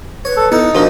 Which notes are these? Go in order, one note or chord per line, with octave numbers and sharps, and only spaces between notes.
B4 C#5
A4
B3 D#4 E4 A4
A#2 F3 D4 F#4 A#4 D#5